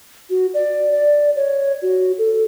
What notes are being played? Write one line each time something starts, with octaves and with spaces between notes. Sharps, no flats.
F#4
D5
D5
C#5
F#4
A4